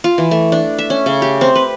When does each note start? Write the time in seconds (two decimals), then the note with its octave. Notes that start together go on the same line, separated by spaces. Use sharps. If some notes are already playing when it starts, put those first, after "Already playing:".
0.04 F4
0.18 E3
0.31 A3
0.52 D4
0.78 E5
0.90 C#4
1.06 C#3
1.22 G4
1.41 C4
1.55 B4